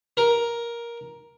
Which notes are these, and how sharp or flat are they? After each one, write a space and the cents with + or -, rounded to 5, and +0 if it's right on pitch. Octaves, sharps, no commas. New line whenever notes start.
A#4 +10